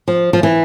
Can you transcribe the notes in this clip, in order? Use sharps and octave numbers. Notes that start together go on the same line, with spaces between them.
F3
F3
E3